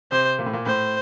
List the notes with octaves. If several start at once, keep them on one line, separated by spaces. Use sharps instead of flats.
C3 C5
A#2
A2
A#2
A2 C5